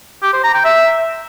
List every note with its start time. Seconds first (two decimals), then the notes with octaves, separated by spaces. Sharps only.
0.23 G4
0.33 C5
0.44 A#5
0.54 G5
0.65 E5